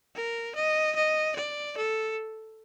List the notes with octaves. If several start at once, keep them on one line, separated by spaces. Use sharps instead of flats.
A#4
D#5
D#5
D5
A4